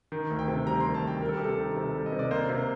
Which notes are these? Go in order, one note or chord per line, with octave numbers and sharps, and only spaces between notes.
D#3
D2
G5
C3
G3 A#5
C6
D#3
A5
D2 G5
G3 A#4
A4
G4
C3 A4
D#3
C3 A4
G3
D#5
C3
D5
A#3 C5
C3